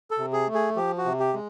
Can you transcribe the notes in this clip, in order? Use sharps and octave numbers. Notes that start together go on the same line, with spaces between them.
A4
C3
G#4
A3
G#4
F3 G4
F#4
C3
G4
G#3